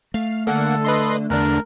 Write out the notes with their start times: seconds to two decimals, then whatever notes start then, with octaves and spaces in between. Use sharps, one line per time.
0.14 A3 F5
0.47 D3 A#3 A4 F#5
0.85 B4 D#5 C6
1.30 E2 D3 D4 A#4 F#6